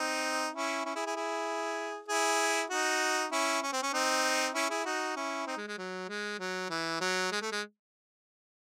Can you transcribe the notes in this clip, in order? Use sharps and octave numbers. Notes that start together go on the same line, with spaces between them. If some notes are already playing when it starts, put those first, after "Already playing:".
Already playing: C4 D#4
C#4 E4
C#4 E4
E4 G#4
E4 G#4
E4 G#4
E4 G#4
D#4 F#4
C#4 E4
C#4
C4
C#4
C4 D#4
C#4 E4
E4 G#4
D#4 F#4
C#4 E4
C4 D#4
G#3
G#3
F#3
G#3
F#3
E3
F#3
G#3
A3
G#3